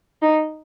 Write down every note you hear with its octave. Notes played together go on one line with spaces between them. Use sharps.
D#4